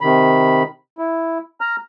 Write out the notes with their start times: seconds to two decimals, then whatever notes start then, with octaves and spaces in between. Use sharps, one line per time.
0.01 C3 D#3 B5
0.98 E4
1.61 A#5 F6